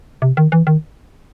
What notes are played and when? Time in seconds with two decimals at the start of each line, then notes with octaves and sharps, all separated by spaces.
0.22 C3
0.37 D#3
0.52 E3
0.67 D#3